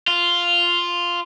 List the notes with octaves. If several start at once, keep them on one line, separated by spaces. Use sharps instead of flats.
F4